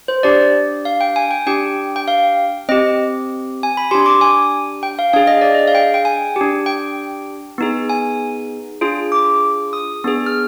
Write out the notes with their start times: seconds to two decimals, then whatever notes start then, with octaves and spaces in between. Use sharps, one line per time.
0.08 C5
0.23 D4 G4 D5
0.85 F5
1.01 G5
1.16 G#5
1.31 G5
1.47 D4 G4 G5
1.96 G5
2.08 F5
2.69 C4 G4 D#5
3.63 G#5
3.77 B5
3.91 D4 G4 C6
4.06 D6
4.21 G#5
4.83 G5
4.99 F5
5.13 D4 G#4 F5
5.27 D#5
5.41 D5
5.54 D#5
5.68 F5
5.75 G5
5.94 G5
6.05 G#5
6.36 D4 G4
6.66 G5
7.58 B3 D#4 G#4
7.89 G#5
8.81 D4 F4 G#4
9.12 D6
9.73 D#6
10.04 B3 D4 G#4
10.26 F6